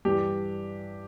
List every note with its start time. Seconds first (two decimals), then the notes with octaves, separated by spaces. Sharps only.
0.05 G2 E3 G4